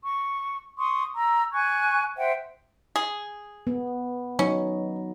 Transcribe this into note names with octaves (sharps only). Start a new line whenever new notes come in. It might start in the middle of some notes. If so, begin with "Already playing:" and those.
C#6
C6 C#6 D#6
A#5 E6
G#5 C#6 F#6 G#6
C5 E5 F#5 G5
G#4
B3
F#3 C#4 D#4